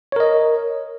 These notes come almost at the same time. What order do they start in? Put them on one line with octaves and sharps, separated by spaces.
C#5 A#4 D#5